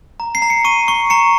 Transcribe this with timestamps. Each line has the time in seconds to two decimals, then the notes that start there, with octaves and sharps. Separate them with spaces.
0.20 A#5
0.35 C7
0.42 A#5
0.50 C#7
0.65 C#6 D#7
0.88 C#6
1.10 A#5 C#7